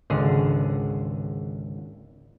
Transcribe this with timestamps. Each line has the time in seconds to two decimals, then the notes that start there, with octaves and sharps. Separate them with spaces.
0.10 G#1 C#2 D3 G#4